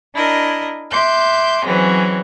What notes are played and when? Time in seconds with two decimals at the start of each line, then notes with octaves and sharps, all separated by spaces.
0.14 D4 E4 A#4 D#5
0.91 E5 C6 D6 F#6 G6
1.63 E3 F#3 G#3 C4 C#4